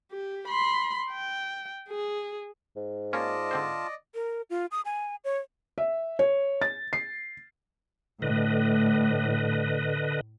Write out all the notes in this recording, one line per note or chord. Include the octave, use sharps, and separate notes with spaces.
G4
B5 C6
G5
G#4
G#2
A#3 C#4 F4 D5 D#5 A5
D3 C4 C5
A#4
F4
D#6
G#5
C#5
E5
C#5
A6
C7
A2 D3 B4 D#5